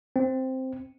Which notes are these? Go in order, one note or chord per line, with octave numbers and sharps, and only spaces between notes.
C4